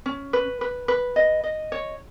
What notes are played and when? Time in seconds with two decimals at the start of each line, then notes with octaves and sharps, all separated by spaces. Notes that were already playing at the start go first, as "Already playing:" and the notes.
0.06 C#4
0.33 B4
0.61 B4
0.88 B4
1.16 D#5
1.44 D#5
1.72 C#5